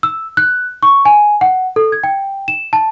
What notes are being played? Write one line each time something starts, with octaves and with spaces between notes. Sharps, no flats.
E6
F#6
C#6
G#5
F#5
A4
G#6
G5
E7
A5